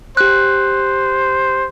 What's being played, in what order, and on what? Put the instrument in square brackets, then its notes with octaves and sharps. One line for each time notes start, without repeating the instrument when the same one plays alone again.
[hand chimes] G4 F#6 [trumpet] C5